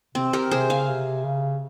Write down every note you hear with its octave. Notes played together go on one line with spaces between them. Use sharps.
C3 C4
G4 A#4
C3 G#4 C5
C#3 F5 G#5
C3
C#3